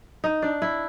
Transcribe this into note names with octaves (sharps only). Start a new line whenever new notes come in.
D#4
D4
E4